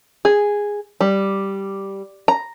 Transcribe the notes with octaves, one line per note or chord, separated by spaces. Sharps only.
G#4
G3
A#5